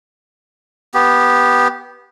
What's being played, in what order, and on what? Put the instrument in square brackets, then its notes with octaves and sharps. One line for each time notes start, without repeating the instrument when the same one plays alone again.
[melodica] B3 G4